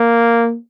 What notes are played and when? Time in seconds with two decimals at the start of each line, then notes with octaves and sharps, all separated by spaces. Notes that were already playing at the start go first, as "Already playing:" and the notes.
Already playing: A#3